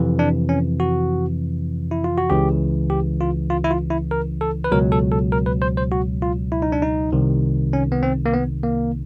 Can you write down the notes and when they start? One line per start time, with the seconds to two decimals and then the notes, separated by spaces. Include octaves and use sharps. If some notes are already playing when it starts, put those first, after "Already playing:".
Already playing: F2 C3 E3
0.19 D4
0.49 C#4
0.80 F#4
1.91 E4
2.04 F4
2.17 F#4
2.30 C#2 C#3 E3 G4
2.90 G4
3.21 F4
3.50 F4
3.64 E4
3.71 F4
3.90 E4
4.11 A#4
4.41 A4
4.64 B4
4.71 C#2 B2 F#3 A#4
4.92 A4
5.12 A4
5.32 A#4
5.46 B4
5.62 C5
5.77 C5
5.92 F#4
6.22 F4
6.52 E4
6.62 D#4
6.72 D4
6.82 D#4
7.12 C2 C3 D#3
7.73 C#4
7.92 B3
8.03 C4
8.26 A#3
8.34 B3
8.63 A#3